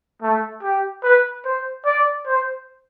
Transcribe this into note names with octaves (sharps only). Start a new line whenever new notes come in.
A3
G4
B4
C5
D5
C5